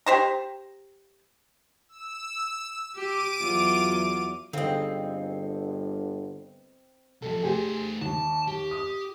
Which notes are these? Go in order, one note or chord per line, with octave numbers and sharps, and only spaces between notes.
G4 C5 A#5
E6
G4 D6 D7 D#7
E2 F#3 F4
G1 D3 C4 D#4 G#4 D#5 F5
C3 F3 A4
A3 G4 G#4 C5
D#2 A5
G4
D#6